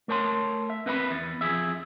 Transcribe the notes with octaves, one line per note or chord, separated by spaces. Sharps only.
A3 A#4 C#5 A5 C6
E5
C4 B4 E5 A#5 B5
E2
F2 C3 G#4 E5